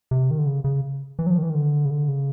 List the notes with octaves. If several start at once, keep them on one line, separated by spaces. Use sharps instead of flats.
C3
D#3
D3
C#3
C#3
E3
F#3
F3
D#3
E3
D#3
D3
C#3
D3
C#3